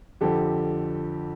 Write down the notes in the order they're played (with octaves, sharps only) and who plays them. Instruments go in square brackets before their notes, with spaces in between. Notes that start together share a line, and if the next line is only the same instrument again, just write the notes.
[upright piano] F2 D3 F3 G4 A4